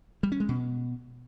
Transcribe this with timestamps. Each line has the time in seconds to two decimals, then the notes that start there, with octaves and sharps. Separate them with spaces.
0.23 G3
0.32 C#4
0.40 G#3
0.49 B2